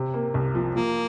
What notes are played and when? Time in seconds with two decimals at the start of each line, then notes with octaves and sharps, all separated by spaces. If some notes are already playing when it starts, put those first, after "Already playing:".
Already playing: C3
0.14 A#3
0.34 C2
0.55 F3
0.75 F3 A#3